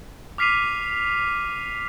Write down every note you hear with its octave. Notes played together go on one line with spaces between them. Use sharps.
D6 F6 B6 C7 D#7 F7